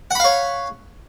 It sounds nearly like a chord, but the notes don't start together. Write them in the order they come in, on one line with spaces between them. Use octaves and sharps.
F#5 B5 F5 C#5